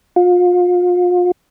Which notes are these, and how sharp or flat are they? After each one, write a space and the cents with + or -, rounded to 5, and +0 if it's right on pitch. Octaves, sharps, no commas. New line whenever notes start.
F4 +35